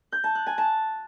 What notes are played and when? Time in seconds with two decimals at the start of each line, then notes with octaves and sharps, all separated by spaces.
0.12 G6
0.24 A5
0.35 F#6
0.47 G#5
0.58 A5